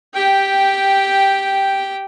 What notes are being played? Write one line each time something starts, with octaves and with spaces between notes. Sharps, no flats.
G4 G5